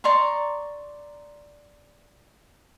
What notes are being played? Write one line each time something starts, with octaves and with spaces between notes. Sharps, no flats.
D5 A#5 C6 C#6